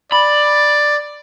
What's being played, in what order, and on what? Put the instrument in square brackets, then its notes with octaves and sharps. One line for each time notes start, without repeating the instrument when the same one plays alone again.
[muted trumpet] D5 [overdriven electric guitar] B5